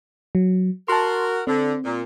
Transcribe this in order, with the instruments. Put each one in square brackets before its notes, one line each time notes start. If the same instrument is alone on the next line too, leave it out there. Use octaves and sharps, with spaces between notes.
[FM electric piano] F#3
[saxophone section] F#4 A#4 [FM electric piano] A5 C6
[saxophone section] D3 [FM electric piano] C4
[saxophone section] A#2